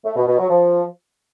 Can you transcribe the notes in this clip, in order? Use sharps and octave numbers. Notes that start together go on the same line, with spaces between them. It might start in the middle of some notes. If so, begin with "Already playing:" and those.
A3
B2
B2
F#3
F3